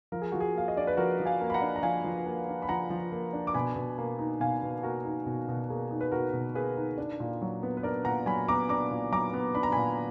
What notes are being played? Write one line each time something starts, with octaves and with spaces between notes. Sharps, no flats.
F3 A#4
G#4
F3 F#4
G#4
A#3 F5
D#5
D4 D5
B4
F3 F#4 A#4
F3
F5 G#5
A#3
B5
F#5 A#5
D4
A#5
F3 F5 G#5
F3
A#3
D4
B5
F3 F#5 A#5
F3
A#3
D4
D6
B2 G#5 B5
B2
A#3
D#4
B2 F5 G#5
B2
A#3 F#4 A#4
D#4
B2
B2
A#3 G#4
D#4
B4
B2 F#4 A#4
B2
A#3 G#4 B4
D#4
D4
A#2
F#3
B3
B4
D4 A#4 D5
A#2 F#5 A#5
F#3 G#5 B5
B3 A#5 D6
D4 A#5 D6
A#2
F#3 A#5 D6
B3
D4 B5
A#5
A#2 G#5 B5